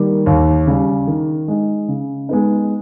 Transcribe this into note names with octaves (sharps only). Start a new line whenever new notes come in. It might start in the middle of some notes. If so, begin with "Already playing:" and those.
Already playing: D#3 G3 A#3
D#2
C#3 G3
D#3
G#3 D#4
C#3
G#3 B3 D#4